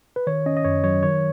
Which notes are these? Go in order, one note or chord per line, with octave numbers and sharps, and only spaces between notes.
B4
D#3 C#5
C#4 D#5
D#5
F#2 C#5
F#3 C#5
D#3 C#5